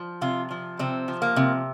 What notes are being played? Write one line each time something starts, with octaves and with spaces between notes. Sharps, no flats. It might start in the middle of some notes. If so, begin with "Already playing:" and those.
Already playing: F3
C3 F4
F3
C3 C4
F3
A#3
C3